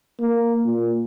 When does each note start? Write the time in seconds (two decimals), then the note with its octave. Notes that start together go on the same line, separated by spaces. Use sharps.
0.20 A#3
0.66 A#2